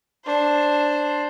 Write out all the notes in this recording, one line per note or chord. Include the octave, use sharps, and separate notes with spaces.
D4 C5